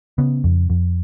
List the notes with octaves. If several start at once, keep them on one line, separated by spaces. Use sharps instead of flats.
C#3 B3
F2
F2